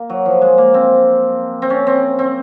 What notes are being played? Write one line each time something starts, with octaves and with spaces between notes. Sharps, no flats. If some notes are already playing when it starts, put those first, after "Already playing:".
Already playing: A#3
F#3
F3
G#3
A#3
C4
C4
C#4
C4
C4